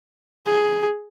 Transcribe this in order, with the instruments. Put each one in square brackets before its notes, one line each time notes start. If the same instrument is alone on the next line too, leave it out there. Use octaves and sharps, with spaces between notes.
[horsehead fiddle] G#4